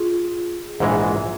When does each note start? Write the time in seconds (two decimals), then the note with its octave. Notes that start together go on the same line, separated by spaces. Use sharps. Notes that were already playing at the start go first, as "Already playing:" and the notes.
Already playing: F4 G#4
0.80 A#1 G#2 E3 G#3